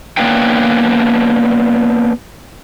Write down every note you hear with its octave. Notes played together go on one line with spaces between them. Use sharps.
A#3 B3 C#4 D4 G5